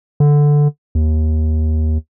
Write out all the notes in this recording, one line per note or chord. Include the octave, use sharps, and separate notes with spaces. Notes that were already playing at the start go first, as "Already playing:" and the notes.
D3
D#2